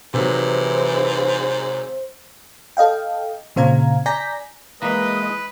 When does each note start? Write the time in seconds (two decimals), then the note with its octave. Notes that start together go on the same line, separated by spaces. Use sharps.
0.14 G#2 C3 D#3 E3 F#3 C5
2.77 A4 D#5 F5 G5
3.56 A#2 C#3 C4 F5 A#5 G#6
4.06 D5 G#5 A#5 G6 A#6 B6
4.82 E3 G#3 A#3 B4 D#5 A#5